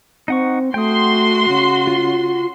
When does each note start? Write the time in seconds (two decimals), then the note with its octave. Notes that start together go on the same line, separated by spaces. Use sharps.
0.28 C4 D#4 F#5 C#6
0.74 A3 F#4 G5 C6 D#6
1.48 C#3
1.87 F4